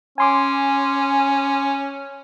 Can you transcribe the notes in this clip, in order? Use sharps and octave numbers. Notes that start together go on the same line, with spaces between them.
C#4 G#5 C6 D6